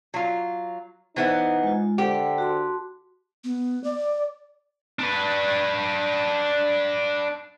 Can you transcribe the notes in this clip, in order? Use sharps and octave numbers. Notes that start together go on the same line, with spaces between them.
F#3 F4
E3 B3 D#4 C5 E5
G#3 F4
D3 G4 C5 F#5 G5
F#4 A5 C6
B3
D5
D4 B4